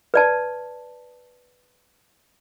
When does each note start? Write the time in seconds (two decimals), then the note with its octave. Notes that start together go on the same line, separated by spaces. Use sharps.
0.14 B4 D5 A5